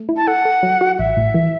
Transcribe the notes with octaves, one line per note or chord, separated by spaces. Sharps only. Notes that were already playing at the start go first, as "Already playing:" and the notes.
Already playing: A3
E4
A5
A4 F#5
A4
F#3
F#4
A1 E5
A2
E3